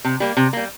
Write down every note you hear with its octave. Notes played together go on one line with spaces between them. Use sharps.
C3
G3 A#3
C3
G3 A#3